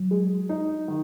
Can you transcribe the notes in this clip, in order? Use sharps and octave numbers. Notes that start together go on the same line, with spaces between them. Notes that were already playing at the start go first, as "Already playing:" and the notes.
Already playing: F#3
G#3
D#4
D#3